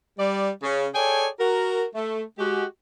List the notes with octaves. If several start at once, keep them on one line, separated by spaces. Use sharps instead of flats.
G3 D5
C#3
G#4 A4 C#5 D5 G5 G#5
F#4 A#4
A3
G#3 F#4 G4